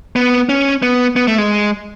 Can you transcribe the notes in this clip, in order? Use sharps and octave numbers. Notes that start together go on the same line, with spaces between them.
B3
C#4
B3
B3
A3
G#3